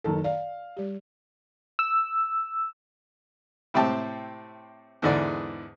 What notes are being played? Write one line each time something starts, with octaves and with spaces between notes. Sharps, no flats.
F#1 D#3 A4
D5 F5
G3 G4
E6
A2 C3 C4 G4 G5 A5
E2 G#2 D3 E3 D5